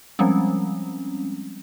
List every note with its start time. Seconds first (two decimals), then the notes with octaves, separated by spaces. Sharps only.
0.19 F3 G3 G#3 C4 C#4